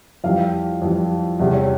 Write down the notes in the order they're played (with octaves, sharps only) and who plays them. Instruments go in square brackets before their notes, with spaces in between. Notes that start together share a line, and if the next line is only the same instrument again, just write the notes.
[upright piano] F2 E3 G3 F5
F2 E3 G3
E2 C3 G3 E5
C#5